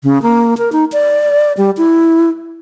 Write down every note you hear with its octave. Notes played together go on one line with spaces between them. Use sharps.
C#3
A#3
A#4
D#4
D5
G3
E4